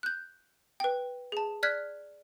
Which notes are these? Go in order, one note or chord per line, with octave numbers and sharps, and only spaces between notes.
F#6 G6
B4 G5
G#4 A5
D5 F6 F#6 G#6 B6